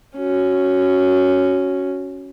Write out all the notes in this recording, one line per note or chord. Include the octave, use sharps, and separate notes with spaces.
C#4 F#4